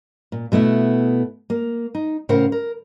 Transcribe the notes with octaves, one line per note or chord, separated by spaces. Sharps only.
A#2
B2 A3 B3 E4
A#3
D#4
A2 C#3 A#4 C5 F5 F#5
A#4